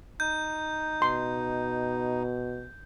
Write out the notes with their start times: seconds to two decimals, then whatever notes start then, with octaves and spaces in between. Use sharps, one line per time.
0.20 D#4 G6
1.02 B2 C6